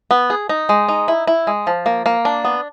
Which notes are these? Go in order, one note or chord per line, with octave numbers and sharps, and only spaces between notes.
B3
G#4
D#4
G#3
D#4
E4
E4
G#3
F3
A#3
A#3
D4
B3